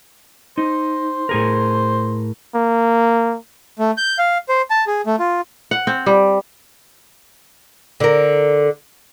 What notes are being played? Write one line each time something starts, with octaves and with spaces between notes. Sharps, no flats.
D#4 C5
A2 G#4 A#4
A#3
A3
G6
F5
C5
A5
G#4
A3
F4
F#5
C4
G3
D3 A#4